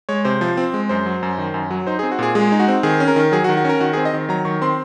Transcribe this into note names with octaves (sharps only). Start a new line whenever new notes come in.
G#3 C#5
C3 C5
F3
C4
G#3
F#2 C5
F#3
F#2
D#3
F#2
F#3
D#4 C5
G#4
C4
F#4
A#2 G#4
G#3 G#4
D#4
F#4
C4
D#3 G#4
C#4
A#4
D#3
F#3 G#4
F#4
D#3
F#4
C#4 A#4
D#3 F#4
G#4
C4
D#5
D#3
F#3 A#5
D#3 C#6
C4 C6